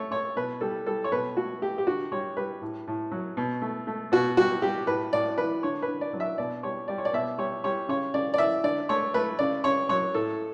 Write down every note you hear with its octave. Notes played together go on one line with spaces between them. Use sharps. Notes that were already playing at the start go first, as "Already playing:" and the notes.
Already playing: A3 C#5
A3 C#5
B2 B4
G3 A4
G3 A4
C#5
B2 B4
A3 F#4
A3 G4
G4
D3 F#4
G3 C#5
G3 B4
A2
A2
F#3
B2
A3
A3
B2 F#4
G3 F#4
G3 G4
A2 B4
A2 D5
E3 B4
D3 C#5
B4
D3
D5
F#3
E5
B2 D5
G3 C#5
G3 D5
C#5
D5
B2 E5
G3 C#5
G3 C#5
C#3 C#5
C#3 D5
D5
E3 E5
D3 D5
A3 C#5
A3 B4
C#3 D5
C#3 C#5
F#3 C#5
A2 A4